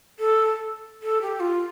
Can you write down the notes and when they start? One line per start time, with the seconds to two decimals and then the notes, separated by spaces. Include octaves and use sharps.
0.19 A4
1.03 A4
1.22 G4
1.40 F4